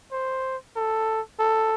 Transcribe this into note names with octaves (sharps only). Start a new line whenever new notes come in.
C5
A4
A4